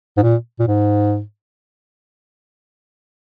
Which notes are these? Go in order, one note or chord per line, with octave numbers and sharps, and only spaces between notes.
G#2
A#2
A#2
G#2